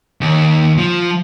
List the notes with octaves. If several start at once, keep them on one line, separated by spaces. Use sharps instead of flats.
D#2
F3